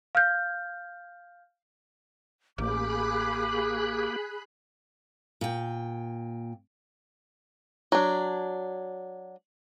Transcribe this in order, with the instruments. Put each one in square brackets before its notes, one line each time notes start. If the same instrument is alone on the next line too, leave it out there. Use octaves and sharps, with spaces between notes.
[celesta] F5 F6 G6
[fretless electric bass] A1 [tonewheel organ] A#3 G4 [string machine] G#4 B5 F#6 [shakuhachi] D6
[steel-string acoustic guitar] A#2 G5
[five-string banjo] F#3 D4